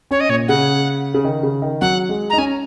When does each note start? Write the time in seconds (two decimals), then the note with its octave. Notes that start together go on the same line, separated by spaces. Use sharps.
0.11 C#4 C#5
0.20 D#5
0.29 A#2 C#5
0.48 C#3 F#5
1.14 C#3
1.24 D#3
1.43 C#3
1.62 D#3
1.81 F#3 F#5
2.09 G#3
2.30 D#4 A#5
2.38 C#4 G#5